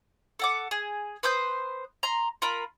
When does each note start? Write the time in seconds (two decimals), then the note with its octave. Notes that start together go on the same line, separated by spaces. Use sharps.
0.39 A4 F#5 D6
0.71 G#4
1.23 B4 C5 D#6 G6
2.03 A#5 C6
2.42 F4 A#4 B5